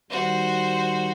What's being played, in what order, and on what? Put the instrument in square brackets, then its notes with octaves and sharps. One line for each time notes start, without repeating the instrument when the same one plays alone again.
[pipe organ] D#3 G3 [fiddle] F#4 C5